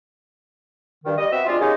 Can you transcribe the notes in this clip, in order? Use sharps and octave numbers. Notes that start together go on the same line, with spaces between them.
G2 D#3
G3 D#5
B3 C4 F#4 E5
G#3 C4 D4 F4
G#3 A#3 C#4 D#4 G4 G#4